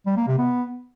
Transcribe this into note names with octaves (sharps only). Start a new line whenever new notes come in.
G3
A#3
C3
B3